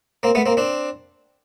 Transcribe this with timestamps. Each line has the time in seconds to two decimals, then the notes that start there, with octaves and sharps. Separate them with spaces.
0.23 A#3 C4
0.35 A3 B3
0.46 A#3 C4
0.57 C4 D4